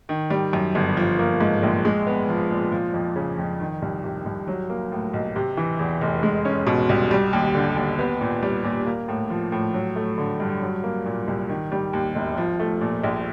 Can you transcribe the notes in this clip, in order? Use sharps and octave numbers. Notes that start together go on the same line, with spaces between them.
D#3
G3
F#2
G1
F3
A#3
G#2
A#1
G#3
B3
F3
A#2
F3
F2
C#3
F2
D#3
C2
C3
C2
F#3
A#3
A2
B1
C3
E3
E2
F1
G#3
C#4
B2
C2
G3
D#2
D3
D#2
B3
A#2
G3
A#2
A#3
A2
F3
A2
F#3
A3
D3
G2
F#3
A#3
A#2
C2
D#3
G3
D#2
E1
F3
A3
A#2
A#1